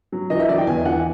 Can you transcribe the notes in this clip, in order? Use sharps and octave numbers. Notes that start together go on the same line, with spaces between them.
F#3
E3 D#5
E5
E3 D5
G5
E2 G#5
E3 F#5